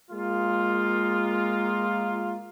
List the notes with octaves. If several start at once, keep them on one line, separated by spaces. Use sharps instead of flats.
G#3 A#3 F4